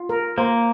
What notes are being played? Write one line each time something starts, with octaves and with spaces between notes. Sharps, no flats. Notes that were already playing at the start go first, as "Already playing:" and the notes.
Already playing: F4
A#4
A#3 C5